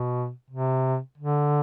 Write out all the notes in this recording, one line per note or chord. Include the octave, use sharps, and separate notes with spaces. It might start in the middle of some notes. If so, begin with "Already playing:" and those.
Already playing: B2
C3
D3